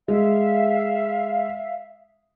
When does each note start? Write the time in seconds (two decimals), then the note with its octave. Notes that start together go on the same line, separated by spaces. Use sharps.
0.08 G#3 E5 F5